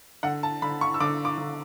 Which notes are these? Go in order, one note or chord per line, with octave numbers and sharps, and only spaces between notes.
D3 F#5
A5
D3 B5
C#6
E6
D3 D6
D6
D3